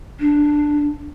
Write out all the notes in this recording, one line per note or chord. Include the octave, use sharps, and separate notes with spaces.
D4